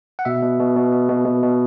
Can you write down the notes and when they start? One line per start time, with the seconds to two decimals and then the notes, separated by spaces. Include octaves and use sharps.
0.19 F#5
0.25 B2 E5
0.42 B2
0.60 B2
0.76 B2
0.92 B2
1.09 B2
1.25 B2
1.43 B2